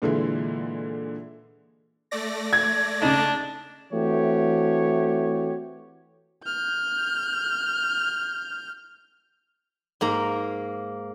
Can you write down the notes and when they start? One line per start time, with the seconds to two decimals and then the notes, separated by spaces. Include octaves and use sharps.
0.02 A#2 D3 E3 G#3
2.11 A3 D5 A#6
2.53 G#6
3.02 C#3 D4 D#4
3.93 E3 A3 C4 F#4 G4 C#5
6.44 F6 G6
10.01 G#2 A#3 A#5